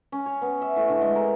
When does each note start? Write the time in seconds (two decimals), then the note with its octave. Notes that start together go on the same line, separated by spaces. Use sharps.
0.12 C#4
0.26 C#5
0.42 B3
0.62 E5
0.76 A2
0.89 D3
1.01 G#3
1.15 A#4